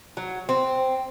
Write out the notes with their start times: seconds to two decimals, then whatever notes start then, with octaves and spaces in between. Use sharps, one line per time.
0.17 F#3
0.49 C4